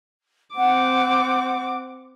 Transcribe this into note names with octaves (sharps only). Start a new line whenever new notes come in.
C4 F#5 D6